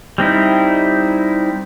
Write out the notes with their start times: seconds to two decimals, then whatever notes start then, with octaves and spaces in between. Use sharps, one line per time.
0.18 G3 C4 D#4 E4